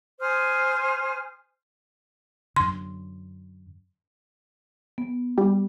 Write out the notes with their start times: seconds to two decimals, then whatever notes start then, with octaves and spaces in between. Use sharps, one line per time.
0.21 C5 G#5 D#6 F6
2.56 F#2 D3 C6
4.98 B3
5.38 G3